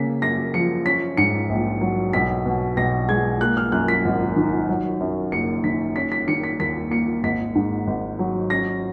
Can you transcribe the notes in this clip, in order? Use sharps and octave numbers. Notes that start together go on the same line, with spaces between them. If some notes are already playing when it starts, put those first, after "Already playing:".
Already playing: C#3 A#3 B6
F#2 A#6
F3 C#7
C#4 B6
G#2 C#7
A#1
F#3
B1 B6
B2
B1 A#6
G#3 G#6
A#3 F#6
F6
F#2 F#6
B6
G#1
D#3
F#3
F#2
F#1 C#7
D#3 B6
C#4 B6
B6
D#3 C#7
B6
D#2 B6
A#3 C#7
G#1 B6
G#2
G#1
F#3
C#4 A#6